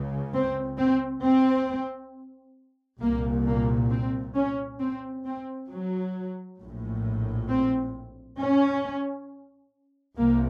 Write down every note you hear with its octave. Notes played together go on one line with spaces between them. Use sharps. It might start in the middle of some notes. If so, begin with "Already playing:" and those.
Already playing: C#2 C#3
C4
C4
C4
C2 A#2 A#3
A#3
C4
C#4
C4
C4
F#3
A#1 A2
C4
C#4
C2 C3 A#3